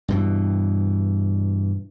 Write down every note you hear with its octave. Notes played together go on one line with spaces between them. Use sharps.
G2 B2 E3